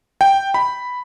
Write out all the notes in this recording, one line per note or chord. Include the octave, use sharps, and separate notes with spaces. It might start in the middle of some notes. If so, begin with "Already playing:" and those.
G5
B5